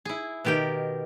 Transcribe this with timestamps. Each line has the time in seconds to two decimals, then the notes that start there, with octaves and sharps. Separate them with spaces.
0.05 E4 G#4
0.45 B2 D#3 G4 A#4 G5